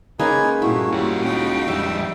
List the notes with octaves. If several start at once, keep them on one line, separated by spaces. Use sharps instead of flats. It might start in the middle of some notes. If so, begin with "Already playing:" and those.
G#3 A#3 C#4 D#4 B4 G#5
G2 A#2 A3 E4 F#4
F#4 G4 C#5
C#4 D#4 F4 G5
F2 G3 D4 E5